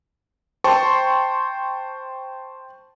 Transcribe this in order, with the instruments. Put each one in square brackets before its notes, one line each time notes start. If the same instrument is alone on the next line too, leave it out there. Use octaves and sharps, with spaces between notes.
[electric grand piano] C5 G5 A5 C6 C#6